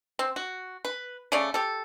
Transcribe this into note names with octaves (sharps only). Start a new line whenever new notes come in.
C4
F#4
B4
C#3 A3 C#5 D5
G4 A4